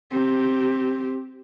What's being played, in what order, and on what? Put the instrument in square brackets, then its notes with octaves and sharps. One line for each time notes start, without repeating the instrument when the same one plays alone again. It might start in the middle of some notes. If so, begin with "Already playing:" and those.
[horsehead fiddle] C4 G4